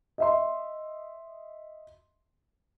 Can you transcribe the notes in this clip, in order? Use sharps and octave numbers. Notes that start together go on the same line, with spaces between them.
D#5 E5 C6